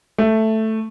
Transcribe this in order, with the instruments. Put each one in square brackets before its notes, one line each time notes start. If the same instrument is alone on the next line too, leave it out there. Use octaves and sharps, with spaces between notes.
[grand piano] A3